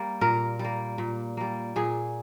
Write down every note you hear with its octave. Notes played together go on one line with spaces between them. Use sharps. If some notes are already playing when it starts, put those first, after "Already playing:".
Already playing: G3 A#3
A#2 A#4
G3
A#3
A#2
G3 A#3
A#2 G#4